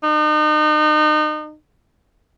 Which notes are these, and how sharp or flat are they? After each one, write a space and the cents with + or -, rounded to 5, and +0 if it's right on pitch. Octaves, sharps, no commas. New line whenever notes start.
D#4 -35